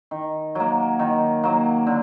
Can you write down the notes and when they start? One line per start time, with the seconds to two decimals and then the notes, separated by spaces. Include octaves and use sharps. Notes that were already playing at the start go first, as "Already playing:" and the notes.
0.11 D#3
0.55 F#3 A#3
0.99 D#3
1.43 F#3 A#3
1.87 D3